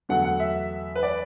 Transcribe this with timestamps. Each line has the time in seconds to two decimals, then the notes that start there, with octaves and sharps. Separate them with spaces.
0.09 E2 D3 F#3 A3 F#5
0.24 F#5
0.40 E5
0.96 B4
1.03 D5